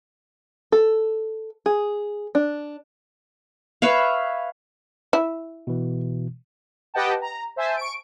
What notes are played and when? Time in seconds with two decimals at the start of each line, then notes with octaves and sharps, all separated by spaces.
0.72 A4
1.66 G#4
2.35 D4
3.82 B4 C#5 E5 F5
5.13 E4
5.67 B2 E3
6.94 G4 B4 D#5 F#5 G5 A5
7.21 A#5
7.56 C5 E5 G#5 A5
7.77 C#6 D7